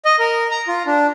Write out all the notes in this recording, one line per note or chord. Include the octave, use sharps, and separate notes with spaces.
D#5
A#4
A#5
F4
D4